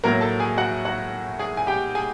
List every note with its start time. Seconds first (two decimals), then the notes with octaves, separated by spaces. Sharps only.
0.04 A2 F#3 A#3 A#4 A#5
0.21 A4 A5
0.40 G#4 G#5
0.57 F#4 F#5
0.85 F#4 F#5
1.39 G#4 G#5
1.57 G#5
1.67 G4 G5
1.95 G#4 G#5